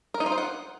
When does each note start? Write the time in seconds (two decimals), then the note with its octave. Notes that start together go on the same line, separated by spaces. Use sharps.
0.14 A#4
0.20 D#4
0.26 F4
0.32 C5
0.38 F#5